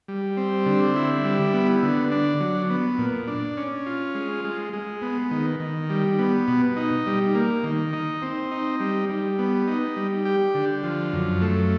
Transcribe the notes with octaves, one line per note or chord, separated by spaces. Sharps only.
G3
C4
D3
E4
G3
B3
D3
D4
F#3
B3
A#2
D4
C#4
F4
G#3
G#3
G#3
B3
D#3
D#3
G3
B3
B2
D#4
G3
A#3
D#3
D#4
C4
D#4
G3
G3
B3
D#4
G3
G4
D3
F3
F#2
A3